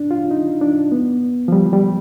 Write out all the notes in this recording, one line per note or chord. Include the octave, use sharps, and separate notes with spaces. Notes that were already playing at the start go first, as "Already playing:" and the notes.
Already playing: D4
F4
D#4
D4
B3
F3
G3
G3